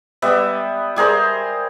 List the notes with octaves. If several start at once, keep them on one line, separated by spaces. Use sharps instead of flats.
G3 B3 E5
G3 G#4 A#4 C5